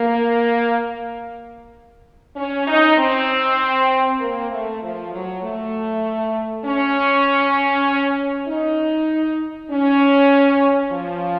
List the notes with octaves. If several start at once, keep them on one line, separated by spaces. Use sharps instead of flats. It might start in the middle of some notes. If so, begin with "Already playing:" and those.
Already playing: A#3
C#4
D#4
C4
A#3
A3
F3
F#3
A3
C#4
D#4
C#4
F3